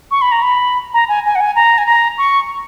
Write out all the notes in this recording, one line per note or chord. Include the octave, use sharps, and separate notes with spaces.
C#6
B5
A#5
B5
A#5
G#5
G#5
F#5
G#5
A#5
G#5
A#5
C#6